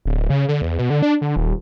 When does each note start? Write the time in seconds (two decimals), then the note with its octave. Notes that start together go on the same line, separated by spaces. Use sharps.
0.05 D1
0.30 C#3
0.49 D3
0.62 E2
0.79 B2
0.90 D3
1.02 D4
1.21 D3
1.36 D#1